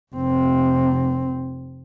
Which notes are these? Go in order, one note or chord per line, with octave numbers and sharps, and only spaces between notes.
F1 C4